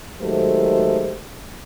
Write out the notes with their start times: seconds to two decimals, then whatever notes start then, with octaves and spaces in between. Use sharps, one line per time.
0.21 D#3 F#3 G#3 A3 G4 C5